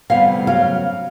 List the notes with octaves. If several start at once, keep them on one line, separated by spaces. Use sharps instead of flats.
D2 C3 E3 G3 B3 F5
C#3 F#3 F5